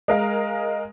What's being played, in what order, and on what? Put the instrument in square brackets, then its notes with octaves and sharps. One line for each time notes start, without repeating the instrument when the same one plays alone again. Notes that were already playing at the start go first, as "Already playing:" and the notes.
[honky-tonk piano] G#3 A#4 F5